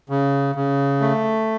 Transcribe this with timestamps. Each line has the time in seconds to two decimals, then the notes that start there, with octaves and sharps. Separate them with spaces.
0.10 C#3
0.55 C#3
1.01 A3